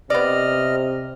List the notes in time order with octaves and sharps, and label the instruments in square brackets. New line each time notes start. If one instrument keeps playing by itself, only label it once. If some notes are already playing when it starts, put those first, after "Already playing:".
[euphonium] C3 [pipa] B3 D5 [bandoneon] D#5 F6